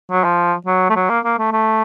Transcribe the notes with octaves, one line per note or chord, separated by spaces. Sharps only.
F#3
F3
F#3
A3
F#3
A#3
A#3
A3
A3